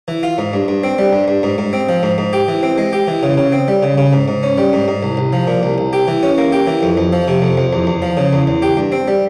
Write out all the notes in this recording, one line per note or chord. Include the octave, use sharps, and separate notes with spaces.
E3
F4
G#2
G2
G2
C4
G3
G2
G2
G#2
G#2
C4
F3
G#2
G#2
G4
E3
C4
G#3
G4
E3
C#3
C#3
C4
G3
C#3
C#3
G#2
G#2
C#4
G3
G#2
G#2
C2
C2
F3
A#2
C2
C2
G4
E3
C#4
A#3
G4
E3
F2
F2
F3
C3
F2
F2
E2
E2
F3
C#3
E2
E2
G4
G2
C4
G3